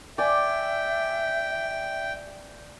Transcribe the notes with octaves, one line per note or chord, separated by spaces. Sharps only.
D5 E5 G5 G#5